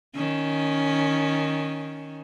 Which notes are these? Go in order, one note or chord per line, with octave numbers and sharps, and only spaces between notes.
D#3 C#4